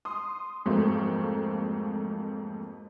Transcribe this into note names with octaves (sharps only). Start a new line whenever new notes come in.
C6 D#6
F2 G#2 F#3 A3 A#3 C4